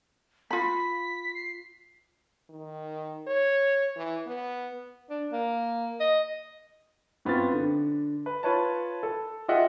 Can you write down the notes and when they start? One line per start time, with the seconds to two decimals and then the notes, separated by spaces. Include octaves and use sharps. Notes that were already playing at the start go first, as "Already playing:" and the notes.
0.51 F4 B5 B6
1.35 C7
2.50 D#3
3.27 C#5
3.97 E3
4.27 B3
5.10 D4
5.32 A#3
6.00 D#5
7.25 F#2 B3 C4 F4 A6
7.53 D3
8.26 B4
8.43 F4 B4 C#5 A5
9.03 A4
9.48 F4 G4 G#4 D#5 E5 F#5